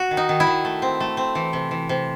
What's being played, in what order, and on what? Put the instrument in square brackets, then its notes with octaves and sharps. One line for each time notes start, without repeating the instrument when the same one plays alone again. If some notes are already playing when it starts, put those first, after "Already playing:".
Already playing: [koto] F#4
D#3
D#4
D#3
E4
D#3
A3
C4
A3
C4
E3
C3
E3
C3